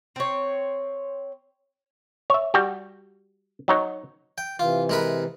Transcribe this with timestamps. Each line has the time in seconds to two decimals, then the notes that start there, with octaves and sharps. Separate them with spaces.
0.16 C4 C#5
2.30 C#5 E5
2.54 G3 F#4 G4
3.68 F#3 D#4 C#5
4.38 G5
4.59 C3 E3 F4
4.90 G#3 A#4 B4